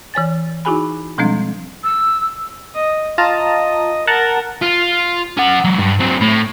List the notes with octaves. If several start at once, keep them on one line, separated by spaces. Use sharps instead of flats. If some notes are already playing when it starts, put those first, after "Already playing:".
E3 C#5 G#5 A6
D#4 E4 F#4 G#4 G#5 B5
B2 F3 G3 G#3 C4 D4
E6
D#5
F4 D#5 A5 A#5
A#4 F#5 A5 A#5
F4
C#4 F#5
F#3 G#3
G2
F#3 C4
A2